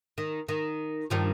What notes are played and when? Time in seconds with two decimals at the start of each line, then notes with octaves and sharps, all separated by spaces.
0.18 D#3
0.48 D#3
1.10 G2 D#3 F3